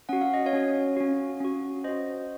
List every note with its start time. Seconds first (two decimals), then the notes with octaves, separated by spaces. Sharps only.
0.09 C#4 F#4 F#5
0.21 F5
0.34 D#5
0.46 C#5 F5
0.53 C#4 F#4
0.97 C#4 F#4
1.40 C#4 F#4
1.84 C#4 F#4 C5 D#5